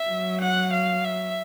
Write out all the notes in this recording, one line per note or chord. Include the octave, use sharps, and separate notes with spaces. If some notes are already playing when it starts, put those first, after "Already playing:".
Already playing: E5
F#3
F#5
F5
E5